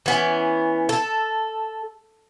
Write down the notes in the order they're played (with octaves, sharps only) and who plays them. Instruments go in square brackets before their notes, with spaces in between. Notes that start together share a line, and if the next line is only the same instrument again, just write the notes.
[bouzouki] E3 B3 C#4
A4